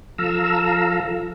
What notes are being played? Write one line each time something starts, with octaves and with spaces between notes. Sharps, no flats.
F3 A4 F5 A#5 E6